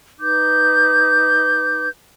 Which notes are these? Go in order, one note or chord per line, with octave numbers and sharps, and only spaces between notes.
D#4 B4 D6 G6